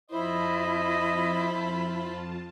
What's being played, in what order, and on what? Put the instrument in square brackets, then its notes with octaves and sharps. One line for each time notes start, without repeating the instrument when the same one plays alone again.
[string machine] F2 F4 A5 [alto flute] E4 [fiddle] C5 B5 [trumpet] D#5